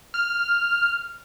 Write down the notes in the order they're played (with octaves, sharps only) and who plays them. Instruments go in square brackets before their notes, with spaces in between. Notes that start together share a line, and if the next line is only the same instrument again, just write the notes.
[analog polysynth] F6